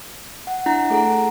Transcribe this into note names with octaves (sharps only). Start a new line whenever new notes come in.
F#5
D4 E4 F#5 A#5
A3 G#4 A4 F#5 A#5